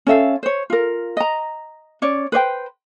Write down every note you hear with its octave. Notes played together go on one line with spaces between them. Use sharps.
C#4 A4 E5 F5
C5 C#5
F4 A#4
D#5 A#5
C#4 C#5 D5
B4 C5 D5 G5